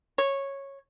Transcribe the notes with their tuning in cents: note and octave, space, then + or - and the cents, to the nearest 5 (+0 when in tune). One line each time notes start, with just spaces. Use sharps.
C#5 -10